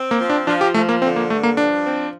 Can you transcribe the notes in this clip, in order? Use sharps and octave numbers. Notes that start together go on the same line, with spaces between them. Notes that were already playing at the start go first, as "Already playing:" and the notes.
Already playing: C4
A#3
F3
D4
F3 D4
G4
F3 A3
A#3
D3 C4
A#3
G2 A3
A#3
F3 D4
C4